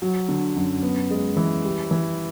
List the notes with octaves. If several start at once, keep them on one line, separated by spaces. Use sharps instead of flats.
F#3
D3
F#2
B3
G#3
E3
G3
E3